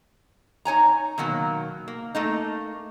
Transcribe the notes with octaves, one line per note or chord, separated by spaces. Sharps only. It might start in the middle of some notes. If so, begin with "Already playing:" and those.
D#4 C#5 G#5 A#5
B2 D#3 F#3 A#3
A#3
A3 A#3 D#4